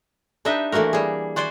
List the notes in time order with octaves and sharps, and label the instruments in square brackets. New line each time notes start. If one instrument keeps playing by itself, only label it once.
[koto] D4 D#4 G4 B4 D#5 E5
E3 A3 A#3 F#4 A#4
G3 G#4
F#4 C5 D5 G5 G#5